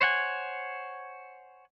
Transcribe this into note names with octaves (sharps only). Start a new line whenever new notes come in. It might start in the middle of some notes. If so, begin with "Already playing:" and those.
C5 C#5 F#5 G#5